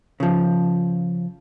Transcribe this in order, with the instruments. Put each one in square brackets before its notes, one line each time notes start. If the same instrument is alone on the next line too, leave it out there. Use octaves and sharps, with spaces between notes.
[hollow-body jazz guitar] C#3 F3